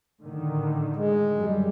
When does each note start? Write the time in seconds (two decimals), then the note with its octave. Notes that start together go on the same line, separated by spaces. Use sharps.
0.21 A2 D3 D#3
0.96 G#3
1.36 F#2 G3